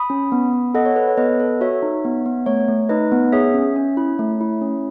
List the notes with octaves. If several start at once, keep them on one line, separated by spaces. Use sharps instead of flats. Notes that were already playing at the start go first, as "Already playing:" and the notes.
Already playing: B5 D#6
C#4
B3
B3
A4 D#5 F#5
C#5
A4 B4
C#5
B3 B4 D#5
A4
F#4 C#5 E5
D#4
B3
B3
A3 C#5
A3
D#4 B4 D#5
B3
G#4 C#5 E5
C#4
C#4
E4
A3
E4
C#4